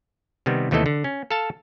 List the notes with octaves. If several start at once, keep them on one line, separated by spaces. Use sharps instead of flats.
C3 D#3 G3 B3
D#2 C3 E3 A3 A4 D#5
D3
C#4
A4 F5 A5